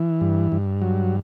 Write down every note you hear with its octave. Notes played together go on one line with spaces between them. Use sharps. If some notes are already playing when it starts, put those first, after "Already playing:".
Already playing: E3
G2
G2
F#3